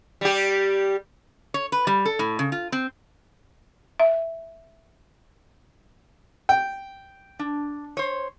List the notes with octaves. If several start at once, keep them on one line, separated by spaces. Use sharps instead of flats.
G3 G4
C#5
B4
G3
A4
A2
C#3
F4
C4
E5
G5
D4
C5 C#5